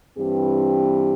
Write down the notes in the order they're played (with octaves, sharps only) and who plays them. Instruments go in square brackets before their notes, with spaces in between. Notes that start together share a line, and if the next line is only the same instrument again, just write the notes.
[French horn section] G2 E3 C4 G4